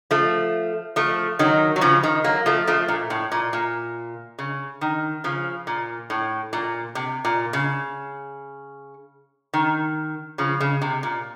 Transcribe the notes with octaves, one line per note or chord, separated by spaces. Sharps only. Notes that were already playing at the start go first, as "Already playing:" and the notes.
F3 A3
F3 A3
D#3 F#3
F#3
C#3 F3
D#3
F#3 A#3
F3 A3
F3 A3
A#2
A2
A#2
A#2
C#3
D#3
C#3 F3
A#2
A2
A#2
C3
A#2
C#3
D#3
C#3 F3
C#3
C3
A#2